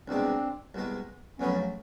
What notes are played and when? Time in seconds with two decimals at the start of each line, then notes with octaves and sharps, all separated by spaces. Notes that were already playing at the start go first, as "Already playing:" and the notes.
0.08 C2 B2 G#3 C4 D4
0.74 C2 B2 G#3
1.39 F2 C#3 F#3 A3 B3 C#4